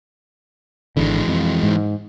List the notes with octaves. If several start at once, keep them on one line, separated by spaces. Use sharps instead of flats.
G#1 D3 E3 G#3
F2
G#2